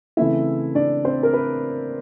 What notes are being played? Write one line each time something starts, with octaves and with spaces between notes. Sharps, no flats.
C#3 E3 A3 C4 E4 E5
D4 D5
C4 C5
A#4
B4